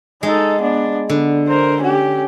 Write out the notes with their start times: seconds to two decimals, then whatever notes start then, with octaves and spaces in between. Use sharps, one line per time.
0.23 G#3 D#4 A4
0.61 B3 D4
1.10 D3 B3
1.48 A#4 C5
1.81 C#4 G4